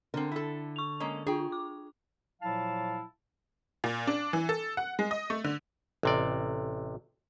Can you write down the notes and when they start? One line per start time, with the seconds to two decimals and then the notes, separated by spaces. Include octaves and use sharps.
0.14 D3 C4 A#4
0.32 E4 A4
0.76 C#6 F7
1.00 G#3 A#3 C#4
1.27 D4 F4 G#4 G5
1.52 D6
2.42 A#2 F3 F#3 E4 F5 A5
3.84 A#2
4.07 D4
4.33 E3
4.49 A4
4.77 F#5
4.99 G#3
5.11 D#5
5.30 A3
5.44 D3
6.03 A1 C3 D5